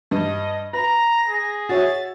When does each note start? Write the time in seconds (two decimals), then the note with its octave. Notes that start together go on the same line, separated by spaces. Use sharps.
0.11 G2 D#5
0.73 B4 A#5 A#6
1.28 G#4
1.69 F#4 C#5 E5 A6